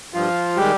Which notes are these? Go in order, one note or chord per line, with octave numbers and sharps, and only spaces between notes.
G2 F3 F4
D#3 G3 G#3 G4